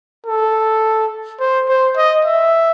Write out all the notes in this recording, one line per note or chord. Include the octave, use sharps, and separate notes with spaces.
A4
C5
C5
D#5
E5